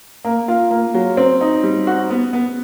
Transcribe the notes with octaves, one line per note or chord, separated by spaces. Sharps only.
A#3
F4
A#3
F#3
C4
D#4
G3
F#4
B3
B3